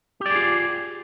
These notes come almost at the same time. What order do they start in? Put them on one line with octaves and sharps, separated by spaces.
G4 D5 G#4 F4